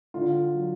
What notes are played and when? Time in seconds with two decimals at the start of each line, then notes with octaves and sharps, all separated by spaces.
0.14 D3 F4
0.54 F#3